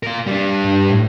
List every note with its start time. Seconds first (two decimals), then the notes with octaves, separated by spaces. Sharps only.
0.03 F4 A#4
0.27 G3 D4
0.64 G2
0.90 A2